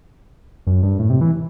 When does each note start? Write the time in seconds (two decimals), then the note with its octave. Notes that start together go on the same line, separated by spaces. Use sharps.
0.67 F#2
0.83 G2
0.99 A2
1.10 C3
1.21 E3